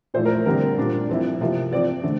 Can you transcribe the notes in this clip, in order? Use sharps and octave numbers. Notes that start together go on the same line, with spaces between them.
A#2 F3 A3 E4 C5
A#4
D3 G3 C4 A#4
A#2 G3 D4
F3 C4 E4
C3 F3 A#3
F3 C4 F4 D5
D3 A3 D4